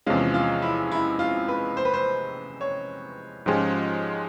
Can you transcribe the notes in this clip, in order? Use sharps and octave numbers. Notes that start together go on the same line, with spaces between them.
E2 C3 F3 G#3 C#4 F4
F4
E4
E4
F4
B4
C5
B4
C5
C#5
G#2 F3 G#3 C#4 F4 G4